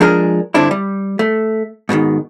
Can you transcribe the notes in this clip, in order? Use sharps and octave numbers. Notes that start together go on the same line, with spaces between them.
F3 G#3 D4 G#4 A#4
G2 D3 C4 D4 E4
G3
A3
G#2 B2 D3 D#3